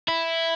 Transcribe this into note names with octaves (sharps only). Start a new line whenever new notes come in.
E4